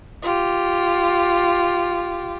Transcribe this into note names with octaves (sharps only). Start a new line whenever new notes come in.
F4 G4